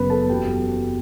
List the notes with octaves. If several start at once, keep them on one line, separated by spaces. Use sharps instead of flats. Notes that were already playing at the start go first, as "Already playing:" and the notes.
Already playing: F#1 F#2 C#3 B3 B4
A4 A5
F#1 E2 B2 F#3 G4 G5